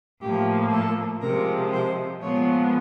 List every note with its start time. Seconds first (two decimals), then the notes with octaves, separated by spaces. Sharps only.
0.22 A2 F3 A#3 G4
0.71 A4
1.21 C3 F3 G#3 A#4
1.72 C5
2.22 A#2 F3 G#3 B3 C#5